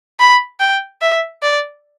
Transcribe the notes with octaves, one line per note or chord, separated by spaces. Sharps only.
B5
G5
E5
D5